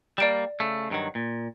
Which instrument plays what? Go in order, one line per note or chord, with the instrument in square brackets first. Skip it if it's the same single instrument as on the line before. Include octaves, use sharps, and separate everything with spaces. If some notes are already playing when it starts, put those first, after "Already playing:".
[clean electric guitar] G3 A#3 [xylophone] D5 D7 E7
[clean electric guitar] C#3 A3
G2 D#3 F#3
A#2